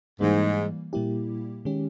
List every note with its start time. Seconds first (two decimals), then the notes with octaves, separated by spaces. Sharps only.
0.21 G#2 E3 G3 A#3
0.93 A#2 G3 A#3 E4 G4
1.65 D#3 G#3 C#4 G4